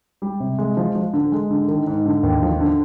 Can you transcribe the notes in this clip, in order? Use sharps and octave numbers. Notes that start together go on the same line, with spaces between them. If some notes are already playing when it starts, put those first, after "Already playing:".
G3
C3
G#3
F3
F3
D3
G#3
D3
D#3
G#2
D3
D#2
F3
D3